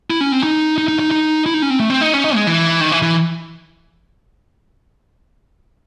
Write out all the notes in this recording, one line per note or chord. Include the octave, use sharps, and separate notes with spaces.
E4
C#4
C4
D#4
D#4
D#4
D#4
D#4
E4
D#4
C#4
C4
A3
C4
D#4
C#4
D#4
G#3
E3
D#3
E3
E3